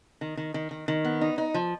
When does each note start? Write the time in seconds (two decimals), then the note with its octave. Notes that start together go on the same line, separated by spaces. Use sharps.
0.21 D#3
0.37 D#3
0.54 D#3
0.71 D#3
0.88 D#3
1.04 B3
1.21 D#4
1.38 D#4
1.54 F3